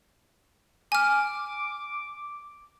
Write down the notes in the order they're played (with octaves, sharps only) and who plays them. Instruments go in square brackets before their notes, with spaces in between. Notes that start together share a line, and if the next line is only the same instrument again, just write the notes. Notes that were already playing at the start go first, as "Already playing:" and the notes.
[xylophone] G#5 F6 [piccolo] D6